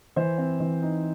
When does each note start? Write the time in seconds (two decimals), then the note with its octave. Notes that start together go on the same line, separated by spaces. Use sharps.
0.16 E3 C5
0.38 C4
0.60 E3
0.82 D#4